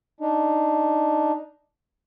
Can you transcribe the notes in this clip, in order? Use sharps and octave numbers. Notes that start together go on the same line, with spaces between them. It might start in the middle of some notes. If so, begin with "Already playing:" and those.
D4 D#4